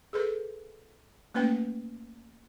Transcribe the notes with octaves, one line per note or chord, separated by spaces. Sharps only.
G#4 A4 B4
A3 A#3 C#4 B4 G5